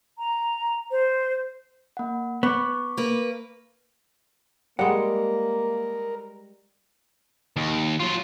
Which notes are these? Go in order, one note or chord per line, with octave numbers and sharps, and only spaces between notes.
A#5
C5
A#3 F#5
B3 C#6 D6
A#3 B4
G3 G#3 A#3 A#4 F#5
D#2
F#3 F4